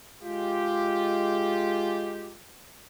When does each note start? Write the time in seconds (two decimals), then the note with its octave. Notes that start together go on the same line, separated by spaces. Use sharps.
0.22 G#3 F4 G4